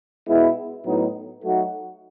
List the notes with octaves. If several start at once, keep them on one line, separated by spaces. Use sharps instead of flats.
B2 G#3 B3 E4
A2 F#3 B3 D#4
F#3 A3 D#4 F#4